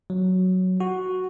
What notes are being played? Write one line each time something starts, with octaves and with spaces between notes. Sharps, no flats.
F#3
F#4